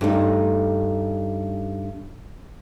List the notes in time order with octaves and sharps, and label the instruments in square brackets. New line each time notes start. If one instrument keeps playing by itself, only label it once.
[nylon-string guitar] G2 A3 D#4